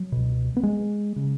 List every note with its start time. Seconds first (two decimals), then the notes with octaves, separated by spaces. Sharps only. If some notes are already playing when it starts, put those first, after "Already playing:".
Already playing: F#3
0.12 C#2 B2
0.57 B3
0.63 G#3
1.16 C#3